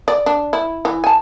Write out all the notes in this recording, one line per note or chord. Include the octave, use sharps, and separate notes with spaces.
D5
D4
E4
E3
G#5 A5